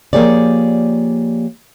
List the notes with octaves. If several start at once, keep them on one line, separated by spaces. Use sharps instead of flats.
F3 A#3 G4 G#4 C#5 D5